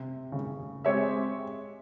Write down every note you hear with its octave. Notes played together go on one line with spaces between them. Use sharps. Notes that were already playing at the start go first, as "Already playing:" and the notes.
Already playing: C3
C#3
G#3 C4 G4 C#5 E5